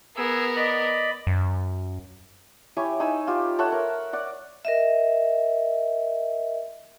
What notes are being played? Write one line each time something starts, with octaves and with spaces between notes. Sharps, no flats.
B3 G#4 A#4 E6
D5 D#5 B5
F#2
E4 G4 C#5 G#5
D#4 G#5 B5 E6
F4 G4
A4 C#5 E5 F#5
A#4
D5 F#5
A#4 D#5 E5